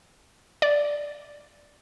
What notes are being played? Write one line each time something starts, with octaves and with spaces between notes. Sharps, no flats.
D5